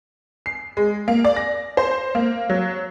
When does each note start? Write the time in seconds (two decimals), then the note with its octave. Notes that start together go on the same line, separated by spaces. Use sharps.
0.46 C7
0.77 G#3
1.08 A#3
1.25 D5
1.36 A#6
1.77 C5
2.15 A#3
2.50 F#3